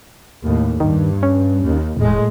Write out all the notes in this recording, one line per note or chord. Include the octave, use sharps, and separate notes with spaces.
D#2 A2
G2 D#3
C#4
D#2
E1 A2 G#3